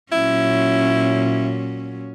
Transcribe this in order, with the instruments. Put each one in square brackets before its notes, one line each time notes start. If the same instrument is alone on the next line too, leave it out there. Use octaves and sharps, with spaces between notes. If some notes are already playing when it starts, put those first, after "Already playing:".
[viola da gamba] A#2 F#3 C#4 [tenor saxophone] E4